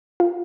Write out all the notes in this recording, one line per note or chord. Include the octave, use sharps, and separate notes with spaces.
F4